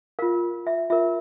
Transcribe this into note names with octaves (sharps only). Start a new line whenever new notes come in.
F4 A#4 F5
E5
F4 A#4 E5